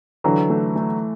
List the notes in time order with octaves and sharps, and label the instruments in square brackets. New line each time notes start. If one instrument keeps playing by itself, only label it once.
[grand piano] D3 F#3 [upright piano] E3
[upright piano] A3
A3